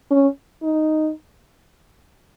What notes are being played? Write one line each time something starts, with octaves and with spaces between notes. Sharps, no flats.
C#4
D#4